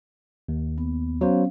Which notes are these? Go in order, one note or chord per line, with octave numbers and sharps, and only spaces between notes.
D#2
B3
F#3 B3 C#4 C5 F5